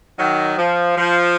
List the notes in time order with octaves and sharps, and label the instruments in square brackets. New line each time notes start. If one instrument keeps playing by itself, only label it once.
[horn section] D#3 F#3
F3
F3